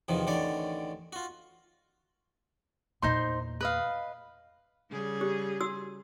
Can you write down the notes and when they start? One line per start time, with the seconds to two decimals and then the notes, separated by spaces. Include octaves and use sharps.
0.08 E2 C3 D#3 F3
0.27 A1 D3 D#3 C#5 D5
1.13 F4 F#4
3.02 E2 A#2 D#4 C5 C6
3.61 B4 D#5 F5
4.90 C#3 G3 G#4
5.21 G4
5.61 F#4 E6